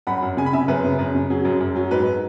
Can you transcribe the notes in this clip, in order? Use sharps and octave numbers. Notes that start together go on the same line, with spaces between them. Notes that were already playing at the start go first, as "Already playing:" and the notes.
F#2 F#5 B5
F#2
C#3 G#5
B5
C#3 E5 G#5
F#2 B4
C#3
F#2
C#3
F#3 G#4
F#2
F#2
F#3
G#2 B4